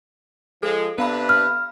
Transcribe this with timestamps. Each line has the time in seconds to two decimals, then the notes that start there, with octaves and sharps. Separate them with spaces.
0.63 F3 G#3 A4
0.98 C3 B3 D4 B4 F5 B5
1.29 F6